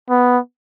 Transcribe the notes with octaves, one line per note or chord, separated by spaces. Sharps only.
B3